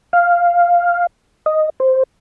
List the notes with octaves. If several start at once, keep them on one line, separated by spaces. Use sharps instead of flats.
F5
D#5
C5